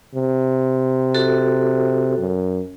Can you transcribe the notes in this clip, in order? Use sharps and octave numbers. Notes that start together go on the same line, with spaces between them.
C3
F#4 A4
F#2